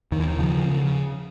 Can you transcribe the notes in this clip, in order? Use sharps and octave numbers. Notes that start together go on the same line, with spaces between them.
D#2 D#3
E3
D#3
C#3 F3
C#3